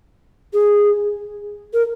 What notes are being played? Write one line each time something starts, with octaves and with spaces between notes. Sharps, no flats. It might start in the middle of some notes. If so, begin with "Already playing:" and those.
G#4
A#4